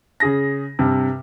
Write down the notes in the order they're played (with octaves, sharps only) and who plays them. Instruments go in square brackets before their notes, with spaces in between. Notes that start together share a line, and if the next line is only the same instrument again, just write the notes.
[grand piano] C#3 G#4 A#6
G2 C3